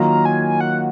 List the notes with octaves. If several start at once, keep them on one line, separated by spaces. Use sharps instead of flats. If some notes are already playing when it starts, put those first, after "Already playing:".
Already playing: D#3 F#3 A#3 F4 A#5
G#5
F#5